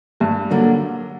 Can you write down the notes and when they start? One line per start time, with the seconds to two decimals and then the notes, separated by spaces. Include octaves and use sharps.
0.20 G2 G3
0.51 D3 F#3 G3 A#3 D4 F#4